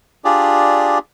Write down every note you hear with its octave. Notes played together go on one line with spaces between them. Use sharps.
D4 F4 G4 G#4 D5